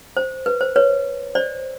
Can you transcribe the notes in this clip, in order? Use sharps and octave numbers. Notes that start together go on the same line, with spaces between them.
C5
B4
C5
B4 C#5
C5 D5